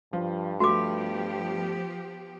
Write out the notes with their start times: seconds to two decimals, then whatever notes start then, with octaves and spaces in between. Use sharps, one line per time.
0.13 G2 F3
0.60 F3 A3 B3 F#4 G4 D6